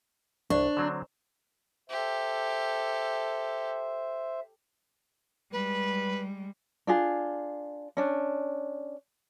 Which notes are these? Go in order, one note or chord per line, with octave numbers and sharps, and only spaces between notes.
C2 D4 C5 D5 C#6
D3 F#3 C4 A#5
G4 A4 C5 E5
G3 G#3 B4
D4 F4 G#4
C#4 D4